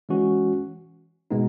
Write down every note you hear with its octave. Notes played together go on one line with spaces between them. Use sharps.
E3 G#3 C#4 F#4
B2 G#3 B3 D#4